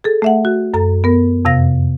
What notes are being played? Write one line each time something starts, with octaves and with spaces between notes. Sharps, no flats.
G#4 A4
A3 E5 F#5
F#4
F#2 A4 A#5
B3 A#4
F2 C3 F5 A#6